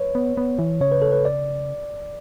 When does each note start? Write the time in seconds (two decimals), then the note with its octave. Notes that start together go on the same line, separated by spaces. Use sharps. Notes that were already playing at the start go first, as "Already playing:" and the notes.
Already playing: B4 C#5
0.15 B3
0.37 B3
0.59 E3
0.81 C#3 C#5
0.92 B4
1.02 A4
1.12 B4
1.25 D5